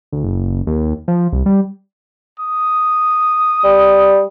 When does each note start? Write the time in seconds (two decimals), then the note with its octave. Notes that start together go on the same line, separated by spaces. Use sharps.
0.12 D2
0.24 F#1
0.67 D#2
1.08 F3
1.32 C2
1.46 G3
2.40 D#6
3.64 G3